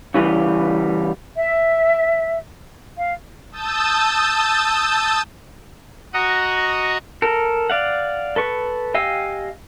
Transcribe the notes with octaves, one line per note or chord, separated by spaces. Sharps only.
C#3 E3 G3
E5
F5
A5 D#6 E6 G6 A6
F#4 D#5 F#5 A#5 C#6 D#6
A4 A#4
D5 F5 F#5
A4 B4 C#6
G4 D#5 F5 G#5 E6